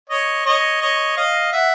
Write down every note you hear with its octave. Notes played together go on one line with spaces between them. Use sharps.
C#5 D#5
C#5 D#5
C#5 D#5
D#5 F5
E5 F#5